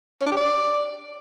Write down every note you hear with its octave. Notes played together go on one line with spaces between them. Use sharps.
C#4
D4
G4
D5